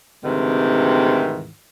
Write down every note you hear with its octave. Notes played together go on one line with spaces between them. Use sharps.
D2 G#2 C3 D#3 E3